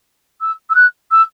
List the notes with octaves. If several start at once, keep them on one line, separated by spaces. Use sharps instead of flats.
E6
E6
F#6
E6